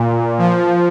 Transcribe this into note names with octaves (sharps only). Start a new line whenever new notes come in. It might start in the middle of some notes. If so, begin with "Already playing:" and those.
Already playing: A#2
F3